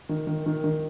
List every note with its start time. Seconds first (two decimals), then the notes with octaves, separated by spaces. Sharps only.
0.09 D#3
0.27 D#3
0.46 D#3
0.64 D#3